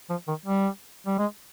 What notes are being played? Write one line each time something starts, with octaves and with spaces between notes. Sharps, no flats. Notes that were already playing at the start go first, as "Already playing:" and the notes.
F3
D#3
G3
G3
G#3